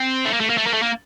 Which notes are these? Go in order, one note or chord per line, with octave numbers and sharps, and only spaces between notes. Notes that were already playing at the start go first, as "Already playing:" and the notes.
Already playing: C4
A3
A#3
A3
A#3
A3
A#3
A3
A#3